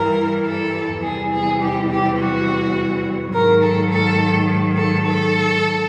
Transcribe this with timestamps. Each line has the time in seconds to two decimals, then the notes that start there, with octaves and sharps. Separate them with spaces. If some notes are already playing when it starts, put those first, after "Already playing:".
Already playing: G2 E3 G3 A#4
0.46 A4
1.03 E2 C3 E3 G3 G#4
1.32 G#4
1.61 G4
1.89 G4
2.19 F#4
3.34 G#2 D#3 F#3 A#4
3.63 A4
3.91 A4
4.77 A4
5.07 A4